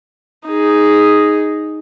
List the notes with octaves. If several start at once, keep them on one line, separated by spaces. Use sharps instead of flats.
D#4 G#4